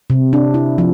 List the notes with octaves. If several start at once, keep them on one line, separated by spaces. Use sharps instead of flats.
C3
D4
E4
F3